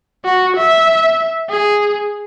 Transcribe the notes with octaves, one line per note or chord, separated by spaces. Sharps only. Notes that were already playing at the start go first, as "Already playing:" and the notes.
F#4
E5
G#4